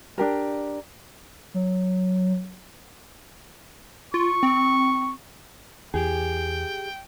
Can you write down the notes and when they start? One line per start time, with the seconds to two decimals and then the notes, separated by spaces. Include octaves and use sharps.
0.18 D4 G4 A#4
1.54 F#3
4.14 F4 C#6
4.43 C4
5.94 E2 E3 G4 G#4 G5